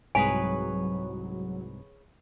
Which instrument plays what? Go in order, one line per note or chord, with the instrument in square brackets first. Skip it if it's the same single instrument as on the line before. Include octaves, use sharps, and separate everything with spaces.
[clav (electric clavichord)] C2 G#2 A#5 [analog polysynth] F#3 [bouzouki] G#4 B4 C#5 [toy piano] G#5